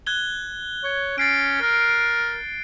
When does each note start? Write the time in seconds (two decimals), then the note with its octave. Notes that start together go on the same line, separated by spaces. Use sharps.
0.07 F#6 G#6 G7
0.84 C#5
1.18 C#4 A6 C7 D7
1.61 A#4